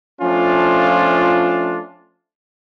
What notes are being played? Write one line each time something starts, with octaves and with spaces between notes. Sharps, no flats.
F3 A3 C#4 D4 F4